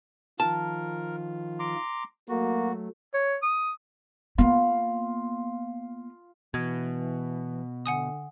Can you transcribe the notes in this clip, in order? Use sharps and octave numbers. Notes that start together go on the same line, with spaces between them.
D#3 F3 F4 A#4 A5
A#5 C6 D6
F#3 A3 A#3 F#4
C#5
D#6
A#3 B3 F4
B2 E3 G#6
D3 F#5 G#5 D#6